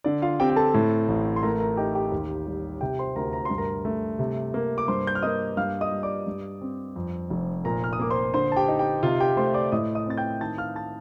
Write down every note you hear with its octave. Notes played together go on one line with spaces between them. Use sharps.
D3 D5
F4 F5
C4 G4 G5
G5
A4 A5
A2
A1
C6
A3 A#4 A#5
A#4 A#5
D#4 G4 G5
G4 G5
D#2
G3
C3 G4 G5
C5 C6
D2 A#4 A#5
A#5
G2 C6
A#4 A#5
A3
C3
A#3
D6
G2 C5 C6
G6
F6
A#3 D#5 D#6
G2 F5 F6
D#5 D#6
G3
D5 D6
G2
C4
F2
F1
A#2 A#4 A#5
F6
D#6
A#3 D6
C5 C6
D3 C5 C6
A5
G4 G5
D#4
G4 G5
C3 F4 F5
G4 G5
A3 C5 C6
D5 D6
A2 D#5 D#6
D#5 D#6
C4 A6
G5 G6
D#3 A5 A6
F5 F6
A5 A6